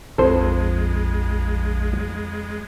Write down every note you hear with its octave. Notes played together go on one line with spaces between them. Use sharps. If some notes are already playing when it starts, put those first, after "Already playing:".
A#1 F2 G#3 A4 C5